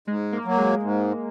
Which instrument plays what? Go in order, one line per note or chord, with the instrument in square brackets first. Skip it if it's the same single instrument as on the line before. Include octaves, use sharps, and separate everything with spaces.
[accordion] G#2 [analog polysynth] G#3
[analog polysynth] A#3
[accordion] F#3 A#3
[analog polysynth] G#3
[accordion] G#2